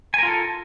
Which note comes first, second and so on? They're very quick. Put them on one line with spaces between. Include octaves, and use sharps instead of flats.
G#5 A#4 F4 A4